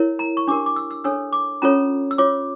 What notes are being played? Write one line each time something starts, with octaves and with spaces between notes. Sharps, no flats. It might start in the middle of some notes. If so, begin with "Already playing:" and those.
Already playing: E4 A#4 C#5
A#5
C#6
D4 G4 A#4 D6
D6
E6
E6
D4 A4 C#5 E6
D6
C#4 F4 A4 C#5 A#5
E6
F4 C#5 D6